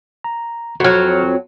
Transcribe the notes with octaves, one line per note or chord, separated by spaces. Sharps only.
A#5
F2 F#3 F#4 F6